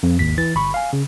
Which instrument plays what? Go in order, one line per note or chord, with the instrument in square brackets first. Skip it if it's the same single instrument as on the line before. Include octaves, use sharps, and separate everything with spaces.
[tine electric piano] F2
G#1 D#2 B6
E3 A6
G1 B5 C#6
F5 G#5
C#3